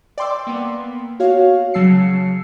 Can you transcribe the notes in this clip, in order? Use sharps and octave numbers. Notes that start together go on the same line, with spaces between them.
D5 G5 C6 D6 E6
A#3 B3
F#4 C#5 F5
C#3 F#3 A5 E6 C7 C#7